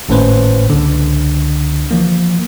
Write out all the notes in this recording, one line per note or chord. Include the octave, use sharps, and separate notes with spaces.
G#1 A2 A#3 C#4 B4 C5
C#2 D3
E3 F3 A#3